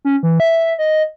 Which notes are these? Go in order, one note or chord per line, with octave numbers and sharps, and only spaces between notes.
C#4
E3
E5
D#5